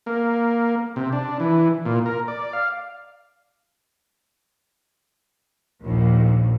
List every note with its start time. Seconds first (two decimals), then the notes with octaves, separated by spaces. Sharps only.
0.06 A#3
0.96 C3
1.13 D4
1.40 E3
1.85 A#2
2.06 A#4
2.28 D5
2.53 F5
5.83 A#1 D#2